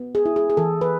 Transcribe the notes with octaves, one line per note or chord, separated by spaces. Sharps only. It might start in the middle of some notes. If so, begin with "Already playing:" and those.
Already playing: B3
G#4
E4
G#4
G#4
E3 A4
B4